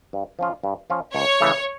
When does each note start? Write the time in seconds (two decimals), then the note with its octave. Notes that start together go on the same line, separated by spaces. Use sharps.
0.13 G2
0.39 F3 C#4 F4
0.64 G2
0.90 F3 C#4 F4
1.14 C#2 C#5
1.40 C#3 E3 A3